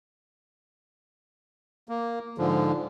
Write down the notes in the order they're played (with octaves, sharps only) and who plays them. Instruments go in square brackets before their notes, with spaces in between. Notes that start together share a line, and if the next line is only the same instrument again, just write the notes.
[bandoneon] A#3
G#2 D3 F3